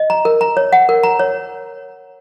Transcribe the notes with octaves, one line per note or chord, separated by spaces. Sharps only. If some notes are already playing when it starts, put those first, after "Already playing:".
Already playing: D#5
A#5
A#4
A#5
C#5
F#5
A#4
A#5
C#5